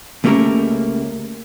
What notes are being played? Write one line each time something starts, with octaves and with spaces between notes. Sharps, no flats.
C#2 A3 A#3 C#4 G4 A#4